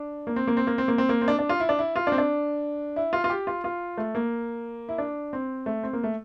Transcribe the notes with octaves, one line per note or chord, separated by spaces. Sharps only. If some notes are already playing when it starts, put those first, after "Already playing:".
Already playing: D4
A#3
C4
A#3
C4
A#3
C4
A#3
C4
A#3
C4
D4
D4
F4
E4
D4
E4
F4
D4
C4
D4
E4
F4
F4
G4
F4
F4
A3
A#3
E4
D4
C4
A3
C4
A#3
A3